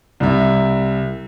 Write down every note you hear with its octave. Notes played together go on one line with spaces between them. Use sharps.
C2 E5